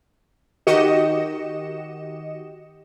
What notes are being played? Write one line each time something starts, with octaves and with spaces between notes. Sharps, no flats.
D#3 F#4 G4 D#5 C#7 E7